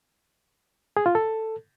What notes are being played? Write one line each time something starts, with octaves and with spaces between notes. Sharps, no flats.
G#4
F4
A4